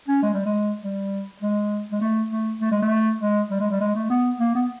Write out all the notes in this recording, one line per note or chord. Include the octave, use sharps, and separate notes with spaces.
C#4
G#3
G3
G#3
G3
G#3
G#3
A3
A3
A3
G#3
A3
G#3
G3
G#3
G3
G#3
A3
B3
A#3
B3